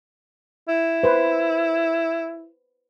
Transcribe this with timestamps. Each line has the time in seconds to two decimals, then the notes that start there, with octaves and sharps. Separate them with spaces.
0.68 E4
1.03 B4 C5